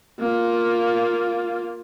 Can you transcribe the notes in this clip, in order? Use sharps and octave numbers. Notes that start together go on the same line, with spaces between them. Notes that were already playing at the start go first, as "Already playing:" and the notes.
A#3 F4